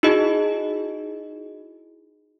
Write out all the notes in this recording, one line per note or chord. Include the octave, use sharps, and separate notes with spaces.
D#4 E4 F#4 G#4 D#5